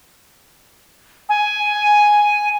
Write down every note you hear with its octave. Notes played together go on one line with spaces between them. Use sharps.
G#5